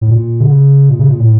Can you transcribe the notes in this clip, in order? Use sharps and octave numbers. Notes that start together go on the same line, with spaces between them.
A2
A#2
D3
C#3
A#2
C#3
A#2
A2